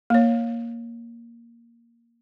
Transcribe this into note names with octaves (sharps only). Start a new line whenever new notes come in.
A#3 C#5